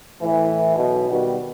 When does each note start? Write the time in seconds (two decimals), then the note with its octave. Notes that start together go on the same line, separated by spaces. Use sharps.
0.21 A2 E3
0.76 B1 B2
1.11 B2 D#3 G3 F#4 B4